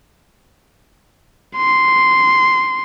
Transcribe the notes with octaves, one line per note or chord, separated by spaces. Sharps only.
C6